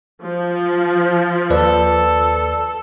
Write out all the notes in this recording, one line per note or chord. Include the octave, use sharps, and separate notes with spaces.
F3
D#2 A4 B4 D5